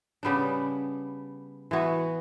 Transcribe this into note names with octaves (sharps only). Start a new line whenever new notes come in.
C#3 G3 B3 D4
E3 B3 F#4